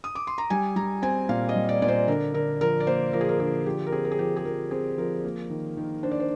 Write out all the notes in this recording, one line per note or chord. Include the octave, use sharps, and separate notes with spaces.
D#6
D6
C6
A#5
G3 G#5
G3 A#5
C4 G#5
A#2 F5
D#5
G3
D5
A#2 D5
C5
D3 A#4
D3 A#4
F3 A#4
D5
A#3 C5
F3 A#4
G#4
A#4
D3 G#4
F3 G4
A#4
C4 G#4
A#4
G#4
F3 G4
G#4
F3 A#4
C4 G#4
F3 A#4
A#3
D#3
D#3
D4 C5
D5
C5